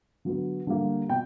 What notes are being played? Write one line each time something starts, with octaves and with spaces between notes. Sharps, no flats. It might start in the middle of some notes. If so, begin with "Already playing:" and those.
D3 F#3 B3
D3 G3 A#3
B2 G5